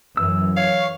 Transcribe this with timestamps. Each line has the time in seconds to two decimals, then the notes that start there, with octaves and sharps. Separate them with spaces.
0.17 F#2 E3 E6
0.57 C#5 F5